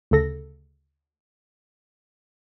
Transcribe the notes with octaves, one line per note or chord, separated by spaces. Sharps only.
D2 C#3 A4 A#6